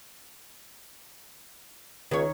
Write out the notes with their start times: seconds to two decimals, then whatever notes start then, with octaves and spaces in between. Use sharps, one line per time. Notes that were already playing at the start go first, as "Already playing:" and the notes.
2.11 C#2 D#3 C#5